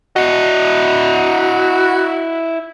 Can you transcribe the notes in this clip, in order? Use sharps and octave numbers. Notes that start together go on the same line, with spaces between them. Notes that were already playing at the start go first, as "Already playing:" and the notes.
E4 F#4 D#5